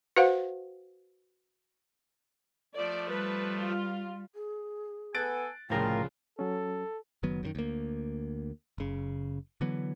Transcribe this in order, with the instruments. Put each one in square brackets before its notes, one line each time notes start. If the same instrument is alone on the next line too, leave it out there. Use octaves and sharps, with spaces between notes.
[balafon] F#4 B4 C5 F5 F#5
[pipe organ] F3 A3 [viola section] D5
[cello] G3 [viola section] B4
[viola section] F4
[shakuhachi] G#4
[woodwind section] B3 A4 G#5 [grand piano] F#6 A6 D7
[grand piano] C2 C#3 F3 [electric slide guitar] A2 A#4 [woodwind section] F4 [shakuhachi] G5
[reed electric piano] F#3 C#4 [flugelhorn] A4
[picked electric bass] F#1 D#3 F#3 B3
F#2 B2 D#3
D2 A#3
F#1 C#3
D3 E3 F#3 B3